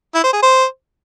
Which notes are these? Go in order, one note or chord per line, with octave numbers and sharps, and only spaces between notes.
E4
C5
G#4
C5